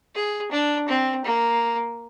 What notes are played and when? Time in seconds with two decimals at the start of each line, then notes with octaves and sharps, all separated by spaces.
0.15 G#4
0.51 D4
0.88 C4
1.24 A#3